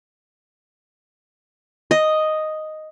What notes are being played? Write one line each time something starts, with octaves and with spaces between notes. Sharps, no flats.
D#5